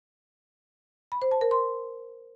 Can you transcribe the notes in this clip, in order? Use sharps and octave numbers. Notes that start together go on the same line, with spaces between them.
B5
C5
A5
A#4
C6